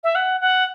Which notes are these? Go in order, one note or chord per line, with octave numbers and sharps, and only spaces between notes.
E5
F#5
F#5